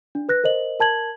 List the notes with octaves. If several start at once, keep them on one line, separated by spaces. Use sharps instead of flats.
D4
B4 F#6 A#6
A#4 C5 D#5 F#7
A#4 A5 G#6 F#7